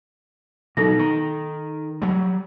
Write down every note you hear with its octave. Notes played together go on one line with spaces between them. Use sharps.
B2 F#3 D#4 A4 A#6
D#3
F#3 G3